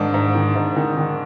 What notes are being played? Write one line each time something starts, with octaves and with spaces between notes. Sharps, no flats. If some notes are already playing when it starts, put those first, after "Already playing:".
Already playing: G#2 D#3 D4
G#2
D#3
G#2
D#3
D#3